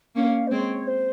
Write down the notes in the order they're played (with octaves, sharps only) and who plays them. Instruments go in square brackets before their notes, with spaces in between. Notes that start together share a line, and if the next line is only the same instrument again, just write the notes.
[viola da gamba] A#3 C#4 [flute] F5
[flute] C5
[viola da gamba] G#3 C4 [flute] C#5
[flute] C5